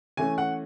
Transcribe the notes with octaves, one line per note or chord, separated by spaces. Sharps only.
E3 A3 C#4 G#5
F#5